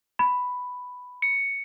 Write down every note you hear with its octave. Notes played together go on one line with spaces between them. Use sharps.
B5
C#7